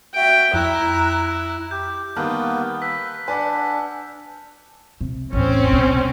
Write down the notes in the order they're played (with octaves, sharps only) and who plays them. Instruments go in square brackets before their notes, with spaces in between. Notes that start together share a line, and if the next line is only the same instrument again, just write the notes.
[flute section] F#4 E5 [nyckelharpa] G5 [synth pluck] D7
[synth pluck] F2 [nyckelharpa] E4 [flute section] A#5 F#6
[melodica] G4 [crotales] G6
[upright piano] D#3 G3 F#6 [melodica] A#3 B3 [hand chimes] A5 [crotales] F6
[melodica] B4 [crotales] E6 B6
[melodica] D4 [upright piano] B4 D5 F#5 [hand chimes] G#5
[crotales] B6
[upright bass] C3
[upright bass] A1 E2 [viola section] C4 C#4
[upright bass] C2 B2